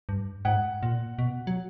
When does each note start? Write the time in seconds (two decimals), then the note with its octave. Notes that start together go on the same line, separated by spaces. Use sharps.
0.09 G2
0.45 G#2 F#5
0.83 A#2
1.19 B2
1.47 F#3